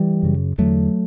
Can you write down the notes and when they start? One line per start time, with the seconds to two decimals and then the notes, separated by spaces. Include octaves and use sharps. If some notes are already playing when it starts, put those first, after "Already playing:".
Already playing: E3 G3
0.23 F#2 C#3
0.58 E2 D3 F#3 A3